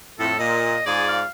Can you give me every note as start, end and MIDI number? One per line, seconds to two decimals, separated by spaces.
0.20 0.34 41
0.20 0.34 45
0.20 0.37 69
0.39 0.77 46
0.39 0.83 75
0.87 1.21 44
0.87 1.21 65
0.87 1.07 68
0.87 1.21 74
1.08 1.27 77